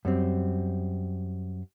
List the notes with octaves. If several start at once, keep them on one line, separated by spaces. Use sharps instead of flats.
F#2 G3 C4